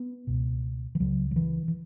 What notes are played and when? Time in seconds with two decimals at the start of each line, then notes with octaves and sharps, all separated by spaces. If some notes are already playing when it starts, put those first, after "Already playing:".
Already playing: B3
0.27 C#2 B2
0.95 E3
1.00 C#2 C#3 F#3
1.31 F#3
1.36 E3
1.68 E3